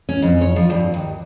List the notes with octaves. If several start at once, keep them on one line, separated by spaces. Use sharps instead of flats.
C#4
F2
C#5
F3
G2
D#2